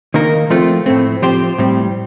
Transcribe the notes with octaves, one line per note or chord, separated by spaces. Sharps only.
D#3 A#3 D#4 A#4
F3 A3 C4 F4
A2 A3 C4
F3 C4 G4 C5
A2 G3 C4